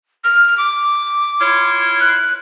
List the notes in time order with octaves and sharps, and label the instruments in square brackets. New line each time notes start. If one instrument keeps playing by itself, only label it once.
[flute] F6
D6
[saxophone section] E4 F4 C#5
[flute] F#6